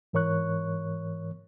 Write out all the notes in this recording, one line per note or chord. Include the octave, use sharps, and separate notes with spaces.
G#2 E3 A#4 C#5 C#6 F#6